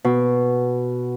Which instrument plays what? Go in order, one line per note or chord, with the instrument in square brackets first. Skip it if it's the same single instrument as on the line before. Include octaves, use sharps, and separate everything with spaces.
[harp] B2